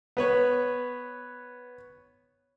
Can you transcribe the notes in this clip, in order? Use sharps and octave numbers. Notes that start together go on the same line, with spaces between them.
B3 B4 C#5